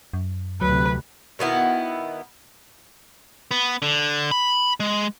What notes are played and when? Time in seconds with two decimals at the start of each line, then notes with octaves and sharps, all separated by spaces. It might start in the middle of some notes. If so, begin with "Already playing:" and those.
0.13 F#2
0.61 D2 C3 F#3 B4
1.39 B2 D#3 B3 E4
3.51 B3
3.82 D3
4.31 B5
4.80 G#3